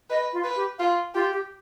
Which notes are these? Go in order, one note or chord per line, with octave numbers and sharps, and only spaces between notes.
B4 D#5
F4
B4
G4
F4 F5
F4 G4
G4